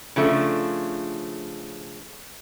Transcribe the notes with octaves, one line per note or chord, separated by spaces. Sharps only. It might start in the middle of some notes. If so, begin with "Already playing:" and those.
C#3 F3 A3 D4